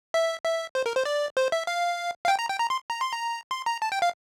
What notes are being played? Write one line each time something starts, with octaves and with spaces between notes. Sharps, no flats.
E5
E5
C5
A#4
C5
D5
C5
E5
F5
F5
G5
A#5
G5
A#5
C6
A#5
C6
A#5
C6
A#5
A5
G5
F5